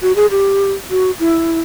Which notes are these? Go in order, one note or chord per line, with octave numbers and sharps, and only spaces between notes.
F#4
G#4
G4
F#4
E4